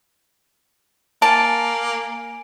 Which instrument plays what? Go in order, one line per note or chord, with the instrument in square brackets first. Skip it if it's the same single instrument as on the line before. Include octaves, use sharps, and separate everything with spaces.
[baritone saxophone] A#3 [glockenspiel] G#5 D7 [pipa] A5